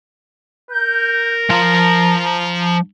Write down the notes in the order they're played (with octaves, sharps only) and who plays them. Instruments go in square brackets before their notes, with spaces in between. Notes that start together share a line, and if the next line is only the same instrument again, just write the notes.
[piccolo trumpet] A#4 [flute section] G6
[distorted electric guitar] F3 C6 [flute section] A#5